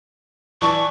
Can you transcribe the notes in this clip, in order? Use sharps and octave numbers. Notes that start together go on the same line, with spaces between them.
E3 D5 A5 C#6